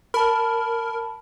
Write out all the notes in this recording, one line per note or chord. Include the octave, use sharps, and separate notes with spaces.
A#4 A5 B5